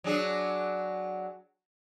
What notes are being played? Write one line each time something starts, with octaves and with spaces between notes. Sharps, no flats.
F#3 D4 G#4